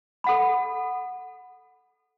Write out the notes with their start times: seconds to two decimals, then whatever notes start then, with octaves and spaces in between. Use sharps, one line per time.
0.24 A4 F#5 B5